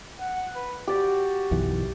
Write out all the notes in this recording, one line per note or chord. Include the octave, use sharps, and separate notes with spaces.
F#5
B4
F#4 G4 D5
B1 F#2 E3